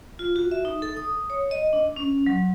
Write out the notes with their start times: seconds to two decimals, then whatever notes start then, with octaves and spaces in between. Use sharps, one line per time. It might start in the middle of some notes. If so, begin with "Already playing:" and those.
0.19 F4
0.36 F#4
0.51 E5
0.65 D#4
0.82 A4
0.97 D#6
1.30 C#5
1.51 D#5
1.73 D4
1.96 C#4
2.26 F#3